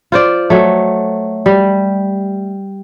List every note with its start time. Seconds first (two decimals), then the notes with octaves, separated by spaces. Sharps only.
0.12 F4 C5 D5
0.50 F#3 A3
1.46 G3